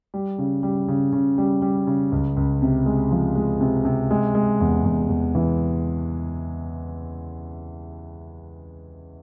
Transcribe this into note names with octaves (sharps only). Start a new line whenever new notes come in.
G3
C#3
G3
C#3
C#3
G3
G3
C#3
C#2
C#2
C3
G#3
F3
G#3
C3
C3
G#3
G#3
E2
E2
E2
E3